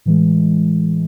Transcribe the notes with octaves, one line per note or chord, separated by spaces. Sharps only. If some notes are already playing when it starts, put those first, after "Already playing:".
A2 E3 G#3